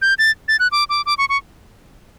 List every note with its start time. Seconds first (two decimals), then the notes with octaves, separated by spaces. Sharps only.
0.02 G6
0.19 A6
0.48 A6
0.59 F#6
0.72 D6
0.90 D6
1.06 D6
1.18 C#6
1.29 C#6